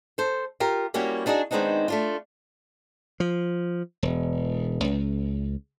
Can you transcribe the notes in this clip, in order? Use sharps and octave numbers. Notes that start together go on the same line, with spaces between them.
A4 C5
F4 G4 A#4
G3 A#3 C#4 E4 F#4 G4
B3 D4 D#4 F#4 G#4
D#3 G#3 B3 C4 D4 D#4
A3 D4 F4
F3
E1
C#2